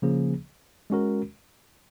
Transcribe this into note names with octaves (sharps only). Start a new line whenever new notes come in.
C#3 F3 A#3 C#4 G#4
G#3 C#4 F#4 A#4